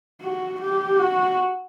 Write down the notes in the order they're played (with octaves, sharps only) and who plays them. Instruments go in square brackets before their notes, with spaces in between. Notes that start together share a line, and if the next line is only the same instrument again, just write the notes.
[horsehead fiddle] F#4
G4
F#4